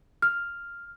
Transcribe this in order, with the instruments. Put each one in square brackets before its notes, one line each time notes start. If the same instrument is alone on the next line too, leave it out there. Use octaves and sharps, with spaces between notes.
[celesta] F6